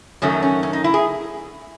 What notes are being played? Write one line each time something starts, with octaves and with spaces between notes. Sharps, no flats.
F#2 D#3 F#3 A3 C#4
C#4
C#4
D#4
E4
G#4